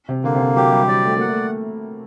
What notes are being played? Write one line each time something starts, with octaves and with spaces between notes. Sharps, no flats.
C3
D3 A#3
C3
D3
F#3 G4
G3
G3 D5
A3
A#3 F#5
A3